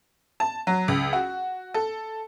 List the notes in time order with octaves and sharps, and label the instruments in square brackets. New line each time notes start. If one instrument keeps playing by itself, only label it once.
[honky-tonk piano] A5
F#3
C#2
F#4
A4